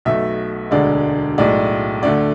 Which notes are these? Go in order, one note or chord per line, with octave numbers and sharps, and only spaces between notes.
B1 B2 A3 E5
E1 D2 D3 G#3 D5
B1 A2 G#3 D5
D2 D3 A3 D5